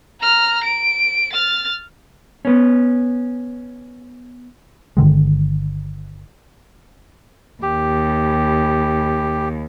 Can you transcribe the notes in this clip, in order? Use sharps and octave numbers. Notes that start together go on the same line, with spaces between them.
A#5 F6
D7
F6 A6
B3 C#4
G1 D3 D#3 G#3
D#2 G4